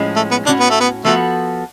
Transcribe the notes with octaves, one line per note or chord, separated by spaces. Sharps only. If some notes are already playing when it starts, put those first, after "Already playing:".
Already playing: A2 F3 G#3 C#4
A3
B3
A2 G#3 C#4 D4 F#4
B3
A3
B3
F3 A3 B3 F#4 A4